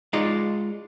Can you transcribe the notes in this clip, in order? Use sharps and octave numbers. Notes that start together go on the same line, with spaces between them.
G#3 D#4 F4 D5